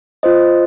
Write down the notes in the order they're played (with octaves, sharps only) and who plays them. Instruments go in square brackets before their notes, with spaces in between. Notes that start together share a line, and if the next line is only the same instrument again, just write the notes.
[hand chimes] F4 C5 D#5